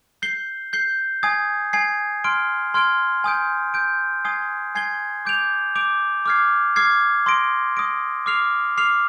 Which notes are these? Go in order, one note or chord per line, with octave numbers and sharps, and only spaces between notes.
G6 C7 G7
G6 C7 G7
G#5 D#6 G#6 C7
G#5 D#6 G#6 C7
C6 F6 G#6 D7 G7
C6 F6 G#6 D7 G7
G#5 D#6 G6 D7
G#5 D#6 G6 D7
G#5 D#6 G#6 C7 G7
G#5 D#6 G#6 C7 G7
D6 G6 D7 F7
D6 G6 D7 F7
D6 F6 G#6 C7
D6 F6 G#6 C7
C6 D#6 A#6 D7
C6 D#6 A#6 D7
D6 F6 C7 F7
D6 F6 C7 F7